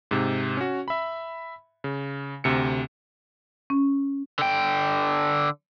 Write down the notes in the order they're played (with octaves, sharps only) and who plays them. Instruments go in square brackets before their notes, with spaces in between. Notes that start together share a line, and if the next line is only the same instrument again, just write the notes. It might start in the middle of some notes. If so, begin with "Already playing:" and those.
[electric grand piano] G#2 C3
C#4 F#4
E5 B5
C#3
D2 C3 C#7
[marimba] C#4
[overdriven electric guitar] D3 G5